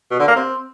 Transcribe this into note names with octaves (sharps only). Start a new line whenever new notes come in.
B2
D3
A#3
C4